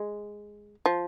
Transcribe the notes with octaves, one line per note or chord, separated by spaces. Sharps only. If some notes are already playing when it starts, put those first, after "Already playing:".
Already playing: G#3
F3